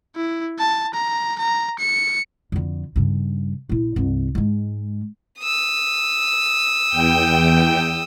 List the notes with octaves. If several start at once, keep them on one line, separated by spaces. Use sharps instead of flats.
E4
A5
A#5
A#5
C#7
F2 D3
G2 C#3
A#1 E4
C2 G2
G#2 G#3
D#6 E6
E2 G5